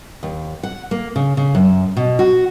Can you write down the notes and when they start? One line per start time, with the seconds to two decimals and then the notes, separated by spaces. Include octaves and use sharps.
0.23 D#2
0.63 F#5
0.91 A#3
1.16 C#3
1.37 C#3
1.55 F#2
1.97 B2
2.19 F#4